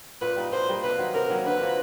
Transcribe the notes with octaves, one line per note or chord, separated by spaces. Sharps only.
A#2 B4
G3 A#3 D#4
A#2 C5
G3 A#3 D#4
C3 B4
D#3 F#3 A#3
C3 A#4
D#3 F#3 A#3
D3 B4
F3 A#3